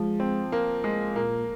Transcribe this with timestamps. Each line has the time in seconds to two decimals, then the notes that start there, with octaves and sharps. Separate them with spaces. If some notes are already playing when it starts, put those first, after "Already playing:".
Already playing: F3 G#3
0.20 C4
0.52 A#3
0.84 G#3
1.16 A#2 A#3